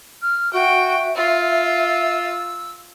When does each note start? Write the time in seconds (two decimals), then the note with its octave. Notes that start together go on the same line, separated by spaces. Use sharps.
0.22 F6
0.53 F#4 E5 G5
1.16 F4 E6